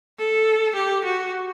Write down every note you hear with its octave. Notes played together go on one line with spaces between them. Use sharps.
A4
G4
F#4